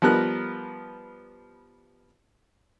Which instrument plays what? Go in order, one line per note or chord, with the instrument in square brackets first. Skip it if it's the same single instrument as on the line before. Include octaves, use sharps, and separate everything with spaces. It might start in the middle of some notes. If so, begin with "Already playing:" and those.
[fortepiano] F3 G3 B3 A#4 F#6